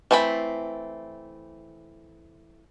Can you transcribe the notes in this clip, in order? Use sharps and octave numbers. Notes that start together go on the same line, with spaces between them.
E3 A3 C4 D#4 B5